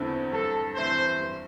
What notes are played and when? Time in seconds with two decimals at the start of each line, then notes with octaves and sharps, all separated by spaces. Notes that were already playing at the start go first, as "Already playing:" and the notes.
Already playing: E2 D3 A3 C4 E4
0.32 G2 A4
0.76 E3 A3 C4 C5
1.20 G2